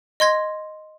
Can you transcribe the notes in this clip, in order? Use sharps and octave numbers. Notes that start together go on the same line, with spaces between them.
D#5 C6 G#6 A#6